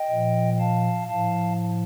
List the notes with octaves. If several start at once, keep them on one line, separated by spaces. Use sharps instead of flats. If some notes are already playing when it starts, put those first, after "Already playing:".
Already playing: D#5 G5
A#2 F3
F5 A5
A2 F3 F5 A5